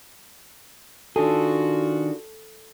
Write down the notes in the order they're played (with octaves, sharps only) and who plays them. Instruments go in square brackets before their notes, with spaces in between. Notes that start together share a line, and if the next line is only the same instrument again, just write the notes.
[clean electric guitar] D#3 D4 G#4 [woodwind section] F4 F#4 [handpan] A4